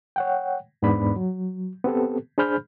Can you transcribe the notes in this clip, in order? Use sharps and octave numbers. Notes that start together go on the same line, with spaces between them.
C#5 F#5 G5
E2 G#2 B3 D4 D5 B5
F#3
B3 C4 G4 A4
D4 G#4 C5 B5 F6 G6